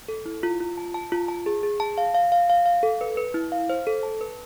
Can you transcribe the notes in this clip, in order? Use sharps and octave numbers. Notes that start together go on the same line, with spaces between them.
A4
E4
F4
F4
A5
A5
F4
A5
G#4
G#4
A5
F5
F5
F5
F5
F5
A4
B4
B4
E4
F5
C5
A4
A5
B4